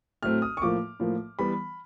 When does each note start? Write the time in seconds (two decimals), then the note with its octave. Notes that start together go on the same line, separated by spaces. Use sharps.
0.23 A2 F#3 A3 C4 F6
0.42 D#6
0.57 C#6
0.62 A2 F3 A#3 D6
1.00 A2 F3 A#3
1.39 E3 G3 B3 B5